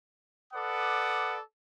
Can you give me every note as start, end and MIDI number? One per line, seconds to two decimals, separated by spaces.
0.54 1.38 69
0.54 1.38 71
0.54 1.38 74
0.54 1.38 78
0.54 1.38 86
0.54 1.38 87